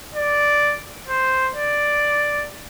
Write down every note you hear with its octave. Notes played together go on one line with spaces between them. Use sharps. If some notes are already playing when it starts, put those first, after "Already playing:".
D5
C5
D5